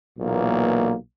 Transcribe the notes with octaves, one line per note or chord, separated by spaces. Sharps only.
B1 A#2 E3 A#3